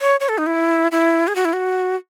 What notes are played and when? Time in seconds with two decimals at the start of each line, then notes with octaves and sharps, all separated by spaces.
0.01 C#5
0.20 C#5
0.29 A4
0.38 D#4
0.47 E4
0.92 E4
1.28 G#4
1.36 F#4
1.45 E4
1.53 F#4